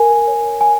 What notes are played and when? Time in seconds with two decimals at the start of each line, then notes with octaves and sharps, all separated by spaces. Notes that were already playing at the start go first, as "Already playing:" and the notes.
Already playing: A#4 G#5
0.27 C#5
0.61 G#5